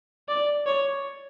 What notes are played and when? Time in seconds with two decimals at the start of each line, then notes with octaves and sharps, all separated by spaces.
0.28 D5
0.66 C#5